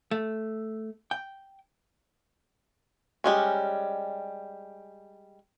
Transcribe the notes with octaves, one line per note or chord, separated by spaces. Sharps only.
A3
G5
G3 G#3 C#4